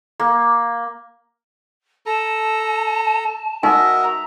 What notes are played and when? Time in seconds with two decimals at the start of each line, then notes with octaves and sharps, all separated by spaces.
0.20 A#3
2.06 A4 A5 A#5
3.63 D#4 F#4 A#4 D#5 E5 G#5
4.02 A#5